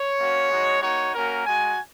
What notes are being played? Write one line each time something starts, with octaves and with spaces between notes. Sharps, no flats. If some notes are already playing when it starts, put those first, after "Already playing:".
Already playing: C#5
A#3 C#4 F#4
G#3 D#4 F#4
A#3 D#4 F#4 C#5
A#3 C#4 F#4 A#4
G#3 F#4 G#5